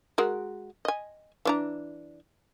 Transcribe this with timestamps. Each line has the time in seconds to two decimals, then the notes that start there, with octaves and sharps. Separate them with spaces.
0.18 G#3 F#4 A#4
0.85 D#5 G#5
1.45 E3 D4 A#5